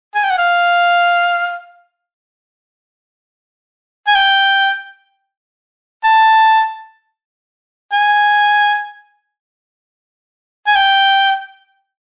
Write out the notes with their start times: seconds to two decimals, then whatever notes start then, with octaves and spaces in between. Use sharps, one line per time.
0.15 G#5
0.24 G5
0.31 F#5
0.38 F5
4.07 G#5
4.15 G5
6.04 A5
7.92 G#5
10.67 G#5
10.75 G5